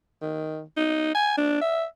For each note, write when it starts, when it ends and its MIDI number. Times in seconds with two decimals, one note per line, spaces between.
0.22 0.62 51
0.77 1.11 63
1.15 1.33 80
1.37 1.59 62
1.61 1.85 76